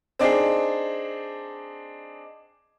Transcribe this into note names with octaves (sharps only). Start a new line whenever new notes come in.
C4 D4 D#4 G#4